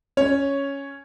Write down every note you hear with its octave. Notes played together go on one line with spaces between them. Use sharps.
C#4 C#5